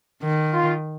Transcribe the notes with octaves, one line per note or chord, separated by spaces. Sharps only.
D#3
F4